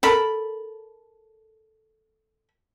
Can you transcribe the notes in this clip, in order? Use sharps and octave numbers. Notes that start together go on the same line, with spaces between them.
A4 A#4 B5